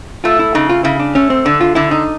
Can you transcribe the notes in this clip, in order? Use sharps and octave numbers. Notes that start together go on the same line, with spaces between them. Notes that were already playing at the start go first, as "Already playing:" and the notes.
A3 F4
E4
C#3 D#4
F4
C#3 E4
D4
A3 C#4
C4
D3 D4
F4
D3 E4
D#4